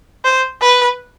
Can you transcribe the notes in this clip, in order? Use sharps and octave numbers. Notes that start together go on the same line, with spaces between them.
C5
B4